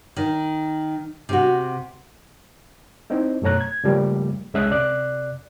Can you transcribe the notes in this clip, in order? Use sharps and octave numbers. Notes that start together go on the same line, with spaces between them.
D#3
C3 F#4
C4 D#4 E4
F#2 B2 A3 C#5 A#5 F#6
G#6
C#3 F3 G3 A3 A#3
C2 G#3 C#4 E5 D#6 F#6
C3 D5 F#6